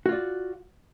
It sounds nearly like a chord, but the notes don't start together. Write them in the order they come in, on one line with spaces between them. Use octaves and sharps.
F#4 F4 D5